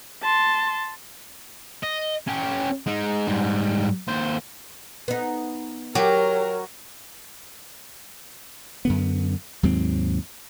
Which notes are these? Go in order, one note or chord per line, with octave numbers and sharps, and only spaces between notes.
A5 C6
D#5
C#4 G4
G#3 D#4
G#2 G3
D#2 C5
B3 D#4
F#3 G4 A#4
F#2 D3 B3
D#2 G#2 F#3 C4